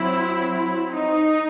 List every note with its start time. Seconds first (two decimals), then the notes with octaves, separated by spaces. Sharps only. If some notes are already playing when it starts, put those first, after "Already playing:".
Already playing: F#3 C4 E4
0.94 D#4